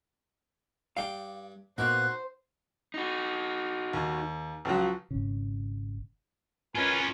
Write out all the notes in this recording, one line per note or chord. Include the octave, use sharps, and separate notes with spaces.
G2 D5 F5 G5
A#2 A#3 B3 D#4 F#4 C5 F#6
D#4 F#4
D#2
C#2 F3 F#3
G#1 C#3
C#4 F4 A#4 B4 G#5